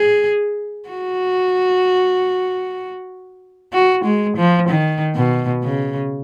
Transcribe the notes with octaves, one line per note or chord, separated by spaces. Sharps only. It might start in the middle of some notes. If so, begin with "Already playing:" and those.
Already playing: G#4
F#4
F#4
G#3
F3
D#3
B2
C#3